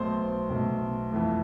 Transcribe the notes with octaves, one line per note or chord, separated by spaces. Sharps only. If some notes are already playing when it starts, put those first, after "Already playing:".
Already playing: B1 B2 A3 C5 C6
B1 B2 A3
F2 E3 A3